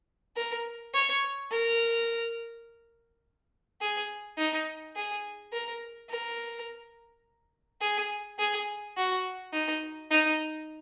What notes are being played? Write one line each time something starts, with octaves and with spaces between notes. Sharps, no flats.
A#4
C#5
A#4
G#4
D#4
G#4
A#4
A#4
G#4
G#4
F#4
D#4
D#4